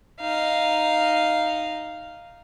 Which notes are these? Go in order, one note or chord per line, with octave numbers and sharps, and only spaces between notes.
D#4 F5